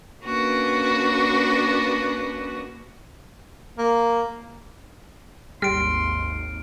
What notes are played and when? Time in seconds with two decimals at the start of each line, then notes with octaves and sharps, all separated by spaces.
0.23 A#3 C#4 D4 F#4 B4
3.79 A#3
5.62 G#1 D#2 G3 C6 F6 D7